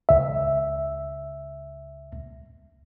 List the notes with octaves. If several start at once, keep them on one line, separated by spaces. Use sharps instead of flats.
C#2 E5